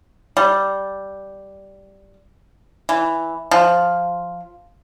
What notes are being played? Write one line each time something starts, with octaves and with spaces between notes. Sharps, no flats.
G3
E3
F3